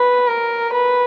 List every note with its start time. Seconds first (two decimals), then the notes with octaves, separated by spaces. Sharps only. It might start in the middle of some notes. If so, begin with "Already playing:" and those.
Already playing: B4
0.28 A#4
0.73 B4